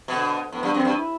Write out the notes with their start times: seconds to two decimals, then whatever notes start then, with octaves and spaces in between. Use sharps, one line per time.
0.08 B2 D3
0.52 A2 B3
0.63 G2
0.74 F#2 C4
0.85 G2
0.96 E4